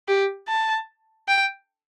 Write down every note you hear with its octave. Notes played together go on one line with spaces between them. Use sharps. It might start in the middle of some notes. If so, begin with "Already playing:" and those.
G4
A5
G5